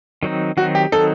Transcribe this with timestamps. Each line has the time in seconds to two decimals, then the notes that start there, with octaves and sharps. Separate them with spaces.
0.23 D#3 F#3 C4 D#4
0.57 D#3 F#3 C4 D#4 F#4
0.75 G4
0.92 D#3 F#3 C4 D#4 A4